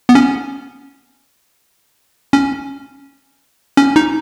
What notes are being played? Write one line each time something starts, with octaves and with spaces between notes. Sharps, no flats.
B3
C#4
C#4
C#4
D#4